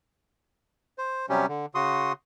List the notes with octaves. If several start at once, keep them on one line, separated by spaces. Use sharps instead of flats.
C5
C3 F#3 G3 C#4 G4
D3
C#3 F#4 C6 D#6